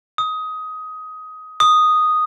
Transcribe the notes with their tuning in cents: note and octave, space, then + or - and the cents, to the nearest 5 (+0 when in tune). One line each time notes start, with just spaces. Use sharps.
D#6 +15
D#6 -5